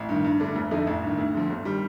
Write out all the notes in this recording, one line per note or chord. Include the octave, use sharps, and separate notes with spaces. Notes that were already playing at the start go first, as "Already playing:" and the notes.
Already playing: A1
G2 D#3
G2
D3 A3 D4
F1
F2 D3 A3 D#4
A1
G2 D#3
D2
D3 F3
G1
D#3 G3